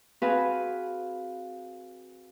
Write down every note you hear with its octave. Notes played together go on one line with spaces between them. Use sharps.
C4 F#4 G#4 B4 F5